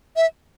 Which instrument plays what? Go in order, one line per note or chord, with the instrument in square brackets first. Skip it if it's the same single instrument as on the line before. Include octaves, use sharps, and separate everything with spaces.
[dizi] E5